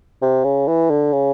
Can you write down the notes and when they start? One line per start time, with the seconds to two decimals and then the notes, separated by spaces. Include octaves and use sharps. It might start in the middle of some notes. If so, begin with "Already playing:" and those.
0.22 C3
0.45 C#3
0.68 E3
0.90 D3
1.13 C#3